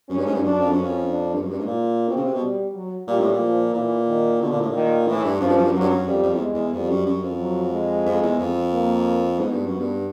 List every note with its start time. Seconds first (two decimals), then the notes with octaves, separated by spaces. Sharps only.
0.09 F#2 C#4
0.18 G2
0.26 G#2
0.34 G2
0.42 F#2 D4
0.59 F2
0.71 F#2 C#4
0.82 F2
1.09 D4
1.34 G2
1.42 F#2
1.50 G2
1.58 G#2
1.67 A#2
2.08 B2 C4
2.17 C#3
2.25 C3
2.34 B2
2.42 G3
2.74 F#3
3.08 A#2 G3
3.20 A2
3.32 A#2
3.41 F3
3.74 A#2 E3
4.08 D#3
4.40 B2 D3
4.51 A#2
4.61 A2
4.71 A#2 D#3
5.07 A2 E3
5.24 G2
5.40 F#2 F3
5.48 G2
5.56 F#2
5.65 G2
5.73 F#2 F#3
5.81 G2
5.89 F#2
6.06 F2 G3
6.23 F2
6.33 E2
6.40 G#3
6.54 E2
6.73 F2 G3
6.89 F#2
7.06 F#2
7.23 F2
7.39 F#3
7.72 G#3
8.06 F2
8.22 E2
8.39 F2
8.72 A#3
9.39 G#2 B3
9.52 G2
9.66 F#2
9.72 B3
9.80 G2